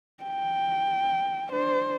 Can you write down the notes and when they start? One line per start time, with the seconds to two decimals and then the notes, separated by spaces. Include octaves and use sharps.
0.23 G5
1.50 D4 C5